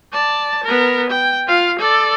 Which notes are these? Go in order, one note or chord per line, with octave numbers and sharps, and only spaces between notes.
D5 A5
B3 A#4
G5
F4 F5
A4 D5